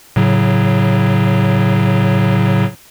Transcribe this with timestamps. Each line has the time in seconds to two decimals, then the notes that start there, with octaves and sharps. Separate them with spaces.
0.16 A2 C#3 F#3